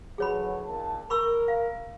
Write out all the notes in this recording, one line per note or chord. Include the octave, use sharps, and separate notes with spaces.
D3 E3 F#3 G#4 C#5 B5
A#2 D#3 A5
A#4 B5 C#6 E6
F5